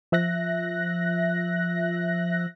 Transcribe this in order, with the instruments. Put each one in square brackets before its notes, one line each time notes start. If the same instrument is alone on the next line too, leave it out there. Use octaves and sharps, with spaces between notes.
[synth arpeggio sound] F3 E5 F#6 A#6